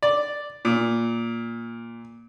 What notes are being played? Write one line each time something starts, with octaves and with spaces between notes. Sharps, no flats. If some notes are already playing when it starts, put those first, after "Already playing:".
D5
A#2